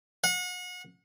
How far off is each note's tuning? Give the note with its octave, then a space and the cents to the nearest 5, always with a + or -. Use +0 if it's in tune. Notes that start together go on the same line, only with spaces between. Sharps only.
F#5 -35